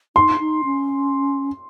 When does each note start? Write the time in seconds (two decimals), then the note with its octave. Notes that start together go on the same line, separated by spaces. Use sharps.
0.16 D#4 C6
0.40 D#4
0.64 C#4